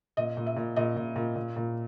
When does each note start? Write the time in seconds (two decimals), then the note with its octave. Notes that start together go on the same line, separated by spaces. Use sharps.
0.17 A#2 D#5
0.37 A#2
0.46 E5
0.56 A#2
0.76 A#2 D#5
0.97 A#2
1.16 A#2
1.36 A#2
1.57 A#2